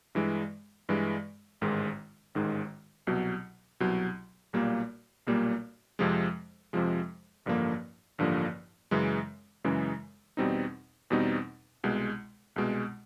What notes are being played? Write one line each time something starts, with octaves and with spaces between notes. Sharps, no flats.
G2 E3 G#3
G2 E3 G#3
A1 G#2 D#3 G#3
A1 G#2 D#3 G#3
C2 B2 F#3
C2 B2 F#3
B1 A#2 G3 A#3
B1 A#2 G3 A#3
F2 C3 F3 G#3
F2 C3 F3 G#3
A1 G2 D3 F3 A#3
A1 G2 D3 F3 A#3
F#2 C#3 E3 G#3
F#2 C#3 E3 G#3
E2 B2 G3 C4 D#4
E2 B2 G3 C4 D#4
C2 B2 G#3
C2 B2 G#3